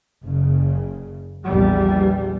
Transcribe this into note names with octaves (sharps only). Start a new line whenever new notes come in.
F#1 C#3
A#1 E2 G3